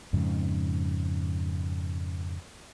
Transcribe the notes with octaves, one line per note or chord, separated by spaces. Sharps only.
F2 G#2 C#3